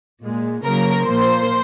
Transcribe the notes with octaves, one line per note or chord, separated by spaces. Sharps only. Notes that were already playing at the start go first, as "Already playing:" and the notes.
A#2 G#3
C#3 F#3 A#3 A#4
A#2 F3 A#3 C5